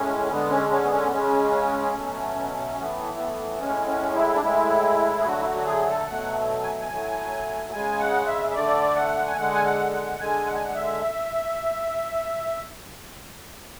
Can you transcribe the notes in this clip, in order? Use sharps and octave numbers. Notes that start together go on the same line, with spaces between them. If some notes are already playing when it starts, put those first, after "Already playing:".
Already playing: A2 G#3 C#4
D3 G#3 B3
C#4
C#4
B3
C#4
B3
C#3 G#3 C#4
B2 F#3 A3
A2 E3 A3 B3
B3
A2 G#3 C#4
C#4
E4
D4
A2 G#3 E4
G#4
D3 F#3 A3 F#4
E4
F#4
F#4
G#4
A4
B2 F#3 A3 F#5
G#5
G#5
A2 F#3 A3
C#3 G#3 G#5
F#5
E5
E5
D3 A3 D5
F#5
G#5
D3 G#3 F#5
G#5
F#5
F#5
D3 G#3 G#5
F#5
G#5
F#5
E5